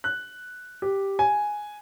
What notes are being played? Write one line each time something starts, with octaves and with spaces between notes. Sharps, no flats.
F#6
G4
G#5